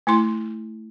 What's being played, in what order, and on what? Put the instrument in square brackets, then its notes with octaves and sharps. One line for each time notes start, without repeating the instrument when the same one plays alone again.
[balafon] A3 E4 C6